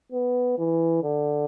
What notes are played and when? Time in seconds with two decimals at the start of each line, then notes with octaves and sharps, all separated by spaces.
0.12 B3
0.58 E3
1.03 D3